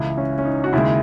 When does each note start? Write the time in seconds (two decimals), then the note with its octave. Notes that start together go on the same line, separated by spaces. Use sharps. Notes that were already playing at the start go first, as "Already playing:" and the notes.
Already playing: C#2 C#3 E3 E4
0.18 C#4
0.38 C#4
0.45 D#4
0.64 F#4
0.73 D#2 C#3 G#3 E4